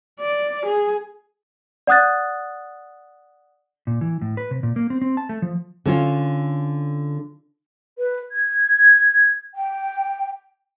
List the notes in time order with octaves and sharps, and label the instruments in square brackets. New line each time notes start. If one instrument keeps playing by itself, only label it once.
[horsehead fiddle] D5
G#4
[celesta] D5 F#5 D#6 F#6 A6
[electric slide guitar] A#2
E3
A2
B4
C3
A#2
A#3
C4
C4
A5
A3
F3
[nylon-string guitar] D3 C#4 F4
[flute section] B4
G#6
G5